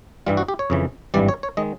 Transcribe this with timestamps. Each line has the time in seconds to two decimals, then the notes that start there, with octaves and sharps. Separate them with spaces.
0.26 G2 E3 G3 F4
0.37 F#4
0.48 G4
0.59 C#5
0.70 F2 C#3 E3
1.14 G#1 G2 E3 G3 D5
1.28 C#5
1.43 C#5
1.57 D#3 G#3 D#5